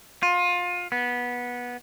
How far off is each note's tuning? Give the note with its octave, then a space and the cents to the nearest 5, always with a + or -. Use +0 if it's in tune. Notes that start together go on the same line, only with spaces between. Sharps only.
F4 +25
B3 -15